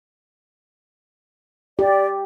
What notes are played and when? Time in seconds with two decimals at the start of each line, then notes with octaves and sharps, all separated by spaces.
1.79 G4 D5